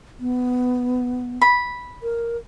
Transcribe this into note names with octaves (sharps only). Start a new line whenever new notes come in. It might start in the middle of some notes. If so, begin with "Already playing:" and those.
B3
B5
A#4